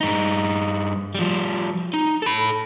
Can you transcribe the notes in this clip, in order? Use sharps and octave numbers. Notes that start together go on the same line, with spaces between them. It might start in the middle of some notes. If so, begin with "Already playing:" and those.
G2 D#4
F3 G3
D#4
A4 B5